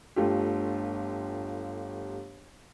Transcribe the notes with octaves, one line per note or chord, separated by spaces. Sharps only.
G1 A3 F4 G4